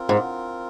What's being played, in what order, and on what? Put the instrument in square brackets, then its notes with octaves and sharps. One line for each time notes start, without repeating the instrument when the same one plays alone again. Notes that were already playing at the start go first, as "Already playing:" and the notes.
Already playing: [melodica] C4 F4 A#4
[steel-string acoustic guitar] G#2